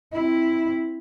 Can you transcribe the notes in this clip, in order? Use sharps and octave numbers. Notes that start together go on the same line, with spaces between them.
C4 E4